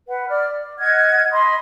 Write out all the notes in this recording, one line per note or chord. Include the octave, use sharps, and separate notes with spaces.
B4 F#5
D5 F6
D5
D#5 F#5 F6 G#6
D#5 B5 C6 D#6